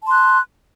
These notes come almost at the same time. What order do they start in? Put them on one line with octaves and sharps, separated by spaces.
A5 C6 F#6